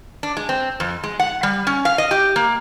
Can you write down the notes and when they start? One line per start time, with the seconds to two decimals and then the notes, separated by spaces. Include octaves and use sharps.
0.23 D4
0.37 G#3
0.49 C4
0.80 F2
1.03 G#3
1.19 F#5
1.43 G3
1.67 C#4
1.85 F5
1.98 D#5
2.11 G4
2.36 A#3